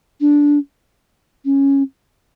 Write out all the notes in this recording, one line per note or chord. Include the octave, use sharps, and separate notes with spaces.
D4
C#4